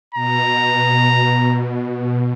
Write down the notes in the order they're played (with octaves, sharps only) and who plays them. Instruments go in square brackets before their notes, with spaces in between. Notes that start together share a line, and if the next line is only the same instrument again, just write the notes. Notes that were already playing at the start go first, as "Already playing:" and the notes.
[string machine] B2 [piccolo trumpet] A#5